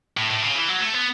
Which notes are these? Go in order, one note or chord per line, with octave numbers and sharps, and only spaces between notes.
A2
A2
C#3
E3
F#3
A3
B3